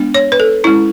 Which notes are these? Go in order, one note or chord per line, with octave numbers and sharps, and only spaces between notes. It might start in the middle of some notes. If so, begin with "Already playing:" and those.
Already playing: G#3 B3 D4
C#5
B4
A4
G#3 C#4 E4